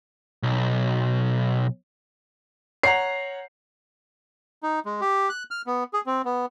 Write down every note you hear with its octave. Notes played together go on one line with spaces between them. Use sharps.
B1
C#5 F#5 A#5 C7
D#4
G#3
G4
F#6
F6
B3
G#4
C4
B3